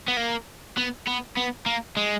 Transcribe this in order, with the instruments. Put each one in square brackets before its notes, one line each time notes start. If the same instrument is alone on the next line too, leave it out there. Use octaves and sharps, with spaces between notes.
[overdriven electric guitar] B3
A#3
B3
B3
B3
A#3
G#3